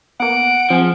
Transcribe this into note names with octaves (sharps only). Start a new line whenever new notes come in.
A#3 B3 F#5 D7
F3 C4 G#4